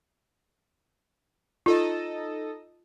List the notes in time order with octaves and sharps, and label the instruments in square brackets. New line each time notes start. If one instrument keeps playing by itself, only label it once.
[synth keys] D#4 A4 D#5 [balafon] F4